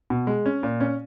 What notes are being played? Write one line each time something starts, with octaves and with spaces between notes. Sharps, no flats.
B2
G#3
C#4
A#2
C#4